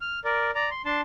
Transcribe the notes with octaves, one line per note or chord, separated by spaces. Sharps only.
F6
A#4 D5
D5 A#5
C6
D4 A5 C6